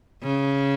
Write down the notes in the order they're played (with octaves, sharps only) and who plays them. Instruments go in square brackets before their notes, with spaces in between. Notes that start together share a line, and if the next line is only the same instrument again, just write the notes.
[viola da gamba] C#3